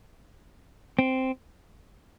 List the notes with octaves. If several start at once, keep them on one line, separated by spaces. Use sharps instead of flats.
C4